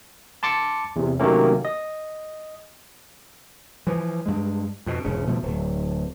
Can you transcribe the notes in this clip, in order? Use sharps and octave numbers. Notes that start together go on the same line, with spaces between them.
A5 C6 D6 A6 C#7
E2 C3
C3 D#3 F#3 A3 A#3 C#4
D#5
E3 F3
G2 G#3
F2 B2
E1 G#2 C#3
B2 F3 A3
D1